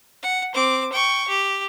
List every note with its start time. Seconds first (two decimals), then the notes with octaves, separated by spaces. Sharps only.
0.23 F#5
0.54 C4 D6
0.93 G5 C#6
1.28 G4